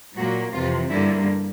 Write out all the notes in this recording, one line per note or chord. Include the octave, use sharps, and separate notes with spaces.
A#2 F#3 A#3 F#4
F2 C3 E3 F4
G2 D3 G3 A#3 E4